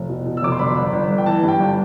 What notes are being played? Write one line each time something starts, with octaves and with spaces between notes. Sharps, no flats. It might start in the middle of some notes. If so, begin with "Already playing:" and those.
Already playing: F1
B2
B2
E6
F1 D6
C6
G1 B5
G1
G1
G1
G5
E3 A5
G2 G5
G1